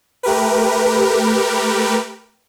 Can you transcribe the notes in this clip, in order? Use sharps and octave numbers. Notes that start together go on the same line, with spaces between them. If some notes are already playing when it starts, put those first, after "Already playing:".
A3 G4 A#4 B4